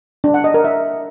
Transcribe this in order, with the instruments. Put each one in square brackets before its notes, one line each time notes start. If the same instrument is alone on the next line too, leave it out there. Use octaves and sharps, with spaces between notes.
[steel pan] D4
F#5
D#5
A#4
E5